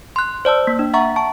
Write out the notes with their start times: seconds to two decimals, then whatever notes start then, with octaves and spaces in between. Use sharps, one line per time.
0.16 C6 F#6
0.45 C5 D5 A5 E6
0.67 A#3
0.79 D4
0.94 E5 F#5 A#5 C#6
1.16 A5 C#6